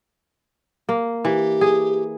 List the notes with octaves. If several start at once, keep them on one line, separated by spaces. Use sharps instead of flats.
A#3
E3 G4
G#4